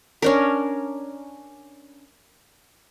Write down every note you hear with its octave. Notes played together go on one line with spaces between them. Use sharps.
C#4 D4 A#4